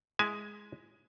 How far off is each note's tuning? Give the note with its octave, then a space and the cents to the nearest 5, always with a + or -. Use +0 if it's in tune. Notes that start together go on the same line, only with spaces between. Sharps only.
G#3 +0 E4 +0 G#5 +25